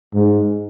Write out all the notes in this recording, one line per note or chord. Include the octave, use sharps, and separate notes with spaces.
G#2